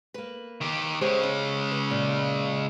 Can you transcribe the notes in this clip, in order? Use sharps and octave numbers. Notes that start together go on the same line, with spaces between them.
A#3 B4
D#3 G4
C#3 G#3 G4 C5 C#5
C#4
B4
A#2